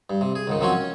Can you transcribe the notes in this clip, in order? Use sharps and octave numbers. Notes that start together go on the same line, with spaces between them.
G2
C3
G#4
C#2 G#2 D#3
D#3 F3 F#3 C4 C#4 F#4
C#4